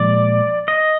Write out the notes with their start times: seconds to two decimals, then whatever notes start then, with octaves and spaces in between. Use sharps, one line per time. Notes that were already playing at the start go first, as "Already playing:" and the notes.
Already playing: A#2 F3 G#3 D5
0.68 D#5